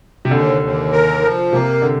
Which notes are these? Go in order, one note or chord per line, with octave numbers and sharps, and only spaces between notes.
C3
D#2 D3
D#2
A#4
F3
C3 A#3
D3